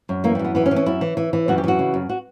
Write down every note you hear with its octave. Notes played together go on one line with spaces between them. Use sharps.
F#2
E3 A#3
G3
F#2
B3
E3 B3
C#4
E3
C#4
F#2 E4
E3
E3
E3
F#2 F#4
G4
E3 F#4
C#3
F#2
F#4